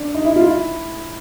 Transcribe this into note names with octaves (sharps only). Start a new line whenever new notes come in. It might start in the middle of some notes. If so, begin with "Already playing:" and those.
Already playing: D4
D#4
E4
F4
E4